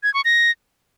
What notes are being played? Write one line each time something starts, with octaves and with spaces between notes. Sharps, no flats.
G#6
C#6
A#6